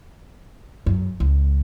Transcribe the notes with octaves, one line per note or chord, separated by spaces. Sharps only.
F#2
C#2